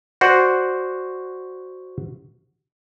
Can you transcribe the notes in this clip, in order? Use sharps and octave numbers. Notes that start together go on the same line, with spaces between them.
F#4 C5 D5 F#5